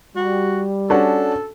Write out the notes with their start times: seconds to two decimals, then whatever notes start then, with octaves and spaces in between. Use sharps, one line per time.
0.16 G3 F#4
0.90 C#4 D4 F#4 A4